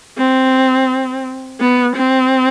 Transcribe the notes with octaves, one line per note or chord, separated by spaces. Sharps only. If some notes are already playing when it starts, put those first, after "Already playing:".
C4
B3
C4